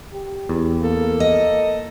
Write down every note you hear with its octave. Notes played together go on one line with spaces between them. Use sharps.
G4
E2
A#3 A4
D#5